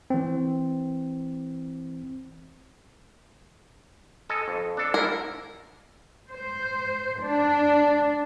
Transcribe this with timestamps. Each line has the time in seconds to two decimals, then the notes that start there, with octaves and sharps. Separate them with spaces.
0.10 E3 C4
4.30 A4 D#5 G#5
4.48 F2
4.77 D4 A4
4.94 A#3 E4 A#4
6.30 C5
7.21 D4